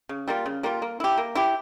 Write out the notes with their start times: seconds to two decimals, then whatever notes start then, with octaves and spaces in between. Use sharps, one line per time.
0.09 C#3
0.28 G3 A#3 F4
0.46 C#3
0.63 G3 A#3 F4
0.82 A#3
1.00 E4 G4
1.18 A#3
1.35 E4 G4